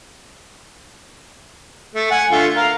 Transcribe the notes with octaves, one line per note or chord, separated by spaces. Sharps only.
A3
F#5 G#5
D3 A3 F4
A#4 F5